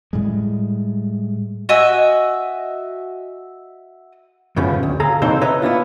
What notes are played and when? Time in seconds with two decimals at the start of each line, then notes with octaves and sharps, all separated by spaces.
0.13 A2 G3 G#3
1.69 F#4 D#5 E5 G#5
4.56 F#2 A2 C#3 F3 B3
4.83 D2
5.00 G#4 A4 F5 A#5
5.22 C#3 E3 C4 D#4 A4 C5
5.41 B4 C#5 D#5 E5 A#5
5.62 B3 D4 E4 F4